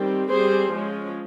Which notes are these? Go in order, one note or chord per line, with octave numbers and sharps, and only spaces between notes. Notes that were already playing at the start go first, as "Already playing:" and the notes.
Already playing: D#3 G3 C4
G3 C4 G#4 C5
F3 G#3 C#4